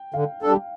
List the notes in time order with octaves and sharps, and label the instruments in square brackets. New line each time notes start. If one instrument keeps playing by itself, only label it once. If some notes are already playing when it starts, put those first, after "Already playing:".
Already playing: [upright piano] G5
[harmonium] D3 [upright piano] F5
[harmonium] G3 D4 A4